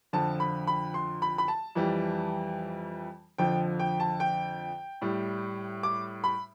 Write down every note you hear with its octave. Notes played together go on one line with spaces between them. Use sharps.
F2 D3 F3 A5
B5
B5
C6
B5
B5
A5
F2 E3 G3
F2 D3 F3 G5
G5
A5
G5
A2 G3
D6
B5